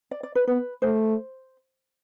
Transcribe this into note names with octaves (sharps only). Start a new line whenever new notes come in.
D5
D5
B4
B3 B4
A3 C5